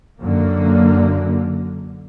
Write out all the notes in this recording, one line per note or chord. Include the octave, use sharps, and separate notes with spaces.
F#2 D3 A#3